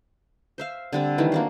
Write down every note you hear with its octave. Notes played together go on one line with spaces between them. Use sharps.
C5 E5 F5
D3 G3 C4
D#3 E3 G3 A3
A#3 D4 F#4